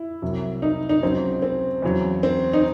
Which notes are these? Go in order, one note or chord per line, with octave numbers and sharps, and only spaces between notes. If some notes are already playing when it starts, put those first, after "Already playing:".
Already playing: E4
C2 C3 F#3
D#4
D#4
C#2 C#3 F#3 C4
C4
E2 C#3 F#3
C4
D#4